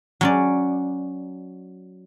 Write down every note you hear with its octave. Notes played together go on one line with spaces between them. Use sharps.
F#3 C#4 D5